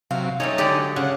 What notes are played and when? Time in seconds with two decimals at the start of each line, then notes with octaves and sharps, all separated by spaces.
0.11 C3 F#3 F5
0.40 G3 A3 C#4 D#4 C#5
0.58 D3 F#3 G#3 G4 D5
0.96 C#3 F#5